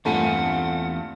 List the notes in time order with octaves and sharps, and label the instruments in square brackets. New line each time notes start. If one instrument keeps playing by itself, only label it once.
[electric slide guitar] E2 C4 G#5 [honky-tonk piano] G2 A#2 A3 [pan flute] F#5